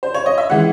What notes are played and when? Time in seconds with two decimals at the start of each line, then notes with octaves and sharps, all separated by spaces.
0.03 C5
0.14 C#5
0.26 D#5
0.38 E5
0.50 E3 G#3 F#5